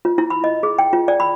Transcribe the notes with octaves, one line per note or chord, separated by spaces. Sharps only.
F4
E4
B5
D#5
G#4
G5
F4
D5
B5